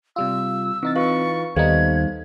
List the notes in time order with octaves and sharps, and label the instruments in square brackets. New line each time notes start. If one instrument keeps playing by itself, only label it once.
[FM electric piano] C3 G3 F4 [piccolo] E6
[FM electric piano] E3 D#4 A6 [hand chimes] C4
[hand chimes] F4 B4 F5 [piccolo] C#6
[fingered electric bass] D#2 [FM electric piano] G3 B3 D#4 [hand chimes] A4 C5 F5 [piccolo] G#6